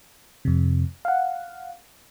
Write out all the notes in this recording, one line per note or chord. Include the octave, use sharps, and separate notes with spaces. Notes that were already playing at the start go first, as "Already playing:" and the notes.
F2 C3
F5 F#5